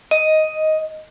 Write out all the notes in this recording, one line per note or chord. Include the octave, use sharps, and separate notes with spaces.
D#5